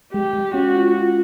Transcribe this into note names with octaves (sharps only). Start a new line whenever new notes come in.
G#3 G4
G#3
C#4 F#4
F4
F4